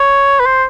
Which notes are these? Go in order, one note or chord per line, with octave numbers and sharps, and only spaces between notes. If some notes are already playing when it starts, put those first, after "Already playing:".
Already playing: C#5
B4
C5